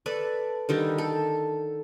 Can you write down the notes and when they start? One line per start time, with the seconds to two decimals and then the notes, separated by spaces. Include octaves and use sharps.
0.06 A4 B4 D5
0.69 D3 D#3 G3 G4
0.98 A4